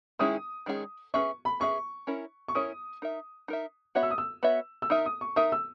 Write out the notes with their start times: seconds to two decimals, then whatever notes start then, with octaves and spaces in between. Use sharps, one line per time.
0.19 D#3 G#3 C#4 E4 G#4 D#6
0.66 D#3 G#3 C#4 E4 G#4
1.14 C#4 G#4 B4 E5 C#6
1.45 B5
1.60 C#4 G#4 B4 E5 C#6
2.07 C#4 E4 A#4 C#5
2.48 C#6
2.55 C#4 E4 A#4 C#5 D#6
3.02 D#4 A#4 E5
3.48 D#4 A#4 E5
3.95 B3 F#4 C#5 E5
4.03 E6
4.11 D#6
4.18 E6
4.43 B3 F#4 C#5 E5
4.82 E6
4.90 D#4 A#4 E5 D#6
5.06 D#6
5.21 C#6
5.36 D#4 A#4 E5 D#6
5.52 E6